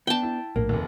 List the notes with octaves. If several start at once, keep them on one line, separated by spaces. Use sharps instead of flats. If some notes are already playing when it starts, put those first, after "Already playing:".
B3 D4 G5 A5
E4
A#1 A2 A#3
F1 D#2